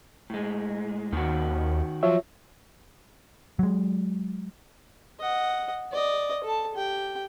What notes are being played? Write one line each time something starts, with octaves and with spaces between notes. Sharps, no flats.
A2 G#3
D#2 D#3 F#4
F3 F#3 F4 C#5 E5
F#3 G#3
D#5 F#5
D5 D#5
A4 A5
G4 G5